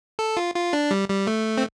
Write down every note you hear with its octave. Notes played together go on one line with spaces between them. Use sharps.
A4
F4
F4
D4
G3
G3
A3
C4